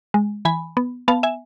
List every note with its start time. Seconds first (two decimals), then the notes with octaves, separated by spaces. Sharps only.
0.14 G#3
0.45 E3 G#5 B5
0.77 B3
1.08 B3 F5 A5
1.23 E5 G#5